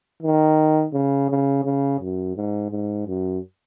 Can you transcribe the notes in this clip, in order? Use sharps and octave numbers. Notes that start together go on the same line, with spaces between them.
D#3
C#3
C#3
C#3
F#2
G#2
G#2
F#2